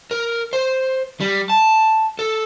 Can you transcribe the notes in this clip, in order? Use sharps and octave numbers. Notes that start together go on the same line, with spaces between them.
A#4
C5
G3
A5
A4